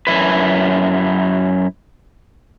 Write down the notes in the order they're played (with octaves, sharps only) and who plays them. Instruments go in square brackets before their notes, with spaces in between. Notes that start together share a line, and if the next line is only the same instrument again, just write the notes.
[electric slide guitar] F#2 E4 B4